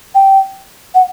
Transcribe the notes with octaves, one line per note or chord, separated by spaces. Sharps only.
G5
F#5